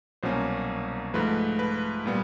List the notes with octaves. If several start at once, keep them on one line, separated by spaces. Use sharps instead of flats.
C2 B2 F#3 A#3 C#4 C5
G#2 F3 A3 B4
B4
A#2 G3 B3